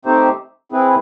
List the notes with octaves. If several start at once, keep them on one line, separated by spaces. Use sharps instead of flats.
A3 C4 D#4 G4 C5
C4 E4 G#4 B4